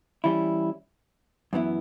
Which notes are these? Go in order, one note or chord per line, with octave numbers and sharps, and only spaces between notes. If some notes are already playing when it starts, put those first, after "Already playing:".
E3 G3 C#4 E4
F#2 E3 B3 E4